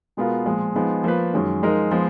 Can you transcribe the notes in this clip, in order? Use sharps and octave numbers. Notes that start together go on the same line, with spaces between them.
B2 G#3 B3 F4 A#4
A#2 F3 G#3
F3 G#3 B3 D#4 G#4
F3 A#3 F4 B4
F#2 D#3 G#3 C#4
F3 G#3 D#4 A#4
F3 G#3 B3